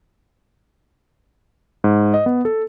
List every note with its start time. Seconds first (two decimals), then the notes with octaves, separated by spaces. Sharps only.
1.84 G#2
2.14 D#5
2.26 B3
2.45 A4